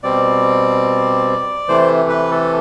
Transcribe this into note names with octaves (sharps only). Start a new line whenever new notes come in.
B2 G3 C4 D5
C3 E3 A3 C5
B4
A4